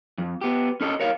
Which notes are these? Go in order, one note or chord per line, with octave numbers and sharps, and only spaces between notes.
F2
B3 G4
C#4 A4 D#5
A#4 C#5 F5